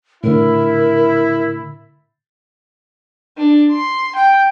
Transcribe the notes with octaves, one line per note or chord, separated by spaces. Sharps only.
A2 D3 E4 A#4
D4
C6
G5